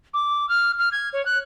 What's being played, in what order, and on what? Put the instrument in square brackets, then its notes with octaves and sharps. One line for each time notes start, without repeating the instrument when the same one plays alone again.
[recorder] D6
F6
F6
G#6
C#5
F#6